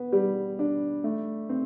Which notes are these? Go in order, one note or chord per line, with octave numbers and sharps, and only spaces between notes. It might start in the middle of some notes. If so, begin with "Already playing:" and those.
Already playing: B3
G3
D4
A3
C4